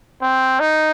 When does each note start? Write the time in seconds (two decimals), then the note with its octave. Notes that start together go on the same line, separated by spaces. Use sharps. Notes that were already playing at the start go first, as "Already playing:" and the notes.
0.22 C4
0.60 D#4